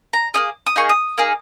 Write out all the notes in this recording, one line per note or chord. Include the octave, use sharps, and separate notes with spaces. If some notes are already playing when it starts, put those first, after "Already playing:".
A#5
A#3 D#4 G#4 D#6
D#6
A#3 D#4 G#4 C#6
D#6
A#3 D#4 G#4